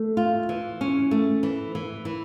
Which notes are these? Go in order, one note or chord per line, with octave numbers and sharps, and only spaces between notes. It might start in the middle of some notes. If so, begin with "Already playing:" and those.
Already playing: A3
F4
E3
C#4
A3
E3
E3
E3